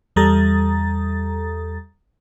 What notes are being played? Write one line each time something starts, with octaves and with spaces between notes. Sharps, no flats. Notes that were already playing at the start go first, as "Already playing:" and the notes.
E2 G3 A4 A#5 D#6 A6